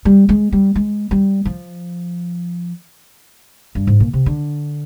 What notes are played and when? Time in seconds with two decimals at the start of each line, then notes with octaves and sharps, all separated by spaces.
0.05 G3
0.29 G#3
0.52 G3
0.76 G#3
1.11 G3
1.45 F3
3.75 G2
3.87 G#2
4.00 A#2
4.13 C3
4.26 D3